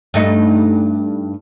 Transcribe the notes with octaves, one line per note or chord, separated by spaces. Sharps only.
G2 A3 D#4